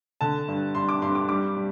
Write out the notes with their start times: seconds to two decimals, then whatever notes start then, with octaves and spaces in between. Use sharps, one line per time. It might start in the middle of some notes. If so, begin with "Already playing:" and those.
0.21 D3 A5
0.48 G2
0.75 G2 C6
0.89 D6
1.02 G2 C6
1.15 D6
1.29 G3 D6
1.56 G3